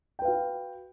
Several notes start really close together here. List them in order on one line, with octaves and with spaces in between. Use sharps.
G5 B4 F5 F#4